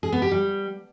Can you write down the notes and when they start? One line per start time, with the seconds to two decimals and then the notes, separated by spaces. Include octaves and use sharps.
0.03 G#4
0.12 B3
0.22 G4
0.31 G3